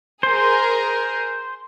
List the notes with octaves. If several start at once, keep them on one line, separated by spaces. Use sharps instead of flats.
G#4 A#4 C5